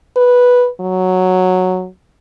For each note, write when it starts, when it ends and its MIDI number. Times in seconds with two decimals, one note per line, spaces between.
0.16 0.68 71
0.81 1.87 54